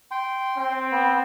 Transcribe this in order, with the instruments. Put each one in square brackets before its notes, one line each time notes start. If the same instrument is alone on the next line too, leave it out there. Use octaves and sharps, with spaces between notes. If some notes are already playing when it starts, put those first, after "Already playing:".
[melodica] G5 C6
[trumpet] C4
[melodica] B3